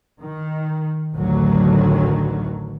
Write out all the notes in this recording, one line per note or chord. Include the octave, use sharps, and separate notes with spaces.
D#3
A1 D2 D3 D#3 F#3